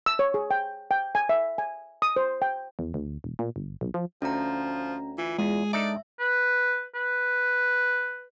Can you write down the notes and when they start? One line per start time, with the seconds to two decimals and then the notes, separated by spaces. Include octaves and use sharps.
0.06 E6
0.19 C#5
0.34 G#4
0.51 G5
0.91 G5
1.15 G#5
1.29 E5
1.58 G#5
2.02 D#6
2.16 C5
2.42 G5
2.79 E2
2.94 D2
3.24 E1
3.39 A#2
3.56 G1
3.81 B1
3.94 F3
4.22 D2 F3 C#4 A#5
5.18 E3 F4
5.38 E2 G#3 G#4
5.73 D4 D#4 A4 D5 E5
6.20 B4
6.95 B4